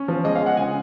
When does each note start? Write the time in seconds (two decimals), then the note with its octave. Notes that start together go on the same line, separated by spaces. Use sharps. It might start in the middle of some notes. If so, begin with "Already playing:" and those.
Already playing: C#4
0.08 F3
0.24 G#3 D#5
0.35 F5
0.41 G#3
0.46 F#5
0.57 C#3 G#5